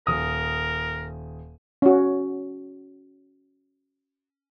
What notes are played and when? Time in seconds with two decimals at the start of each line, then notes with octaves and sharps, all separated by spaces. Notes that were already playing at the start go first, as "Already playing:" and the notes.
0.07 D#1 A#4 D#6
1.82 C#4 F#4